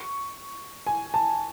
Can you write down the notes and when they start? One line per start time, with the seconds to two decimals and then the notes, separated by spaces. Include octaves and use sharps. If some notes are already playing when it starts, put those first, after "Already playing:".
Already playing: C#6
0.87 G#5
1.14 A5